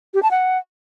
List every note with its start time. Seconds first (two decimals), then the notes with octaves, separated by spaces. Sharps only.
0.14 G4
0.23 A5
0.31 F#5